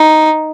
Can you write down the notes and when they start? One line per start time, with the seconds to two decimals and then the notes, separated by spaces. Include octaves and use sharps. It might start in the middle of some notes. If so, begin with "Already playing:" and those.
Already playing: D#4